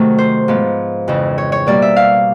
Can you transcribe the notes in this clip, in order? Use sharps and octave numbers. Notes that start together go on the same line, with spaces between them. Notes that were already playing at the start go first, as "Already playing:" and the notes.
Already playing: C3 D#3 F#3 A3
C5
G#2 F3 G#3 B3
F2 C#3 E3
C#5
C#5
B2 G3 A#3 D5
E5
F5